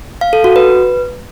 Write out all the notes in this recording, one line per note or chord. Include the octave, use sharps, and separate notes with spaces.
F5
A4
F#4
B4